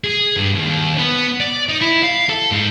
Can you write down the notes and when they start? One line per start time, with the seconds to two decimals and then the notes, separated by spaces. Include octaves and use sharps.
0.04 G#4
0.37 G2
0.55 D#2
0.98 B3
1.40 D5
1.69 D#4
1.81 E4
2.04 F5
2.30 A4
2.51 G#2